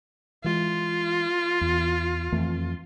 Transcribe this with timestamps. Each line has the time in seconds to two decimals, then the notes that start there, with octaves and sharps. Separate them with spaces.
0.44 E3 G#3 F4
1.61 E2
2.32 F2 E3 A3